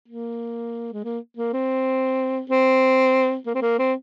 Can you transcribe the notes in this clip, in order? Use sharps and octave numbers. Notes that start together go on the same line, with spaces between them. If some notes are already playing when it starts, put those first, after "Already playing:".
A#3
G#3
A#3
A#3
C4
C4
A#3
C4
A#3
C4